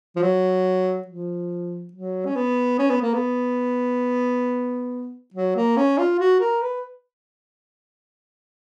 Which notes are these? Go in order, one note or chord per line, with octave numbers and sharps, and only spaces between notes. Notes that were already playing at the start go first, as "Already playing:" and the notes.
F3
F#3
F3
F#3
C#4
B3
C#4
B3
A#3
B3
F#3
A#3
C#4
F4
F#4
A#4
B4